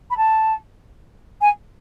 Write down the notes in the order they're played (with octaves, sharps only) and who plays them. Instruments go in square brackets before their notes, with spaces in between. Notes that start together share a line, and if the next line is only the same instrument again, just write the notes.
[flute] B5
A5
G#5